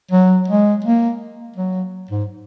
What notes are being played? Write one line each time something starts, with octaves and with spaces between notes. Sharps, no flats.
F#3
G#3
A#3
F#3
G#2